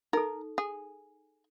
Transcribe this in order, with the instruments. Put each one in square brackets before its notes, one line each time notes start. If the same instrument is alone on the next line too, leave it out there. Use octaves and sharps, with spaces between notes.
[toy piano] D#4 A4 [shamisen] A#4
[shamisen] G#4